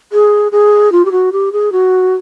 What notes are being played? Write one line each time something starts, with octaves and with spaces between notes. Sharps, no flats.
G#4
G#4
F4
G4
F#4
G4
G#4
F#4